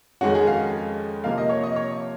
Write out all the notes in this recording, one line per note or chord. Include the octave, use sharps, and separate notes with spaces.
F2 D#3 G#3 C#4 F#4
G#4
F5
C3 F3 A#3 D#4 F5
D#5
C#5
D#5
C#5